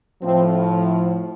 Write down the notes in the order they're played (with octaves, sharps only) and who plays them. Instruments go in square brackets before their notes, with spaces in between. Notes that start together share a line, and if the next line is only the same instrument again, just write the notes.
[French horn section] A2 F3 C4